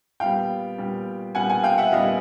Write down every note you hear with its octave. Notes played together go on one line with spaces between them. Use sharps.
A#2 G3 B3 F5 G5
A#2 G3 B3
A#2 G3 B3 F#5 G#5
F#5 G#5
F5 G5
E5 F#5
A#2 G3 B3 D#5 F5